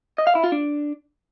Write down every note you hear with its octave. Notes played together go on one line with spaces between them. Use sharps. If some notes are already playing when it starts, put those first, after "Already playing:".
D#5
F5
E4
F4
D4